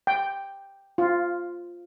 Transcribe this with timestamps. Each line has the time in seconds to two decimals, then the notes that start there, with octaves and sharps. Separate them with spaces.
0.07 G5
0.98 F4